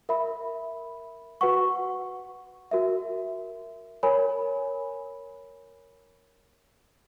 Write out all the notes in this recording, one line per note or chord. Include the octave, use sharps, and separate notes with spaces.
A#4 E5 B5
F#4 B4 F#5 C#6
F#4 A#4 E5
A#4 C#5 G#5 B5